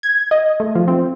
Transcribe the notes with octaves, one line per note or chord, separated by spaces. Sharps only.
G#6
D#5
A3
F3
C4